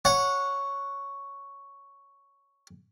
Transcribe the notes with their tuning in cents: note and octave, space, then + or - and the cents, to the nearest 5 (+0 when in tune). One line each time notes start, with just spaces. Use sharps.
C#5 +5 F#5 -15